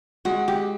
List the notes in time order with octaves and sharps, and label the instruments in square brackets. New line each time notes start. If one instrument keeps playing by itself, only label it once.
[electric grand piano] G#3 [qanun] F#4
[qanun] G4